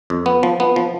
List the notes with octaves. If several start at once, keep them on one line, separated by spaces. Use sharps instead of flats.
F2
B3
F3
B3
F3